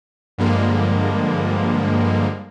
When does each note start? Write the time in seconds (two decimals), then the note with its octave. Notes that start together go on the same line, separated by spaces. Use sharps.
0.38 G2 D3 F3 G3 G#3 A#3